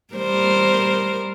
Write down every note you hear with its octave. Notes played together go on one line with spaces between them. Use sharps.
G3 A#4 C5